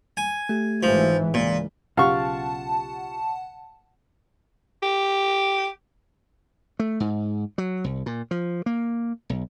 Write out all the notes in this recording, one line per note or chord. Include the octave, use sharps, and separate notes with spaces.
G#5
A3 G4
G#1 G#2 E3 F3
C#2 A#2 E3
B1 C#3 F4 G4 F5 F#5 A5 C#6
G4
A3
G#2
F#3
C2
A#2
F3
A#3
B1